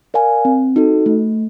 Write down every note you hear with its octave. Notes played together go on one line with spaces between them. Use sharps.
A#4 D5 F5 G#5
C4
D#4 F#4 A4
A3